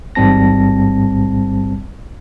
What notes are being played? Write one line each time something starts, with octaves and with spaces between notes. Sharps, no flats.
A1 G#2 G3 C4 A5 A#6